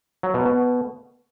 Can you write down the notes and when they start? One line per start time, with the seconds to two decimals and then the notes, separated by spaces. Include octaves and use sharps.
0.23 F#3
0.34 B2
0.45 B2